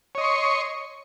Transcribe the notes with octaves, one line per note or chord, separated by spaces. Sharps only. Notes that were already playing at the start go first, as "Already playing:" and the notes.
C#5 D#5 C6 C#6